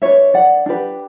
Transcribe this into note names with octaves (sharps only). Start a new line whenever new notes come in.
D4 G4 B4 C#5 E5
D5 F#5
D4 G4 B4